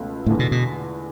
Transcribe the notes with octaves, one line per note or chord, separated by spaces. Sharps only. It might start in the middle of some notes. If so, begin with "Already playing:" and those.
Already playing: C#2 B2 A3 C#4
E2 A2 D3 A3
B2
B2